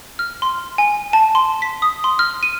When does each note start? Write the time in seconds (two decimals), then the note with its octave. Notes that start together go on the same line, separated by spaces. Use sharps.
0.19 F6
0.42 C6
0.78 G#5
1.13 A5
1.35 C6
1.62 B6
1.82 D#6
2.04 C6
2.19 F6
2.43 D#7